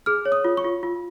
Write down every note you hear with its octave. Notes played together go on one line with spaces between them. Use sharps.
G#4 F6
C#5
D#6
F4
C#6
F4
F4